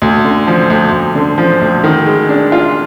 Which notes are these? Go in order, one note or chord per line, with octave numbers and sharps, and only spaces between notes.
D2
D3
F3
D2
D2
D3
F3
D2
D#3
G#3
D4
F4